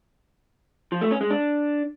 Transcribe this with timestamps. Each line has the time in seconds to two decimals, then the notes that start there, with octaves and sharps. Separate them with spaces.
0.92 F3
1.01 A3
1.11 C#4
1.21 G#3
1.30 D4